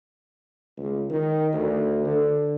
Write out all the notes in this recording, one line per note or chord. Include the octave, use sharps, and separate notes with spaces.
C#2
D#3
D2
D3